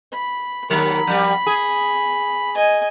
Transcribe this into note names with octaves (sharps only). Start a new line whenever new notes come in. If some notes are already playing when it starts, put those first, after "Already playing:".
B5
D#2 F#3 A#4 B5
F2 G3
G#4
D#5 G#5